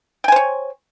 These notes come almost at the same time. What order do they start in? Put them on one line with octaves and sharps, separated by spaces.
G5 G#5 C5 C#5